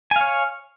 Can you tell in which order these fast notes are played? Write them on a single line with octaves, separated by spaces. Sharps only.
G#5 F5 C#5